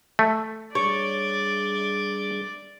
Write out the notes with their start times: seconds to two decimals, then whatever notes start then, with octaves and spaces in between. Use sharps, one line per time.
0.19 A3
0.75 G3 D4 G#4 C#5 D5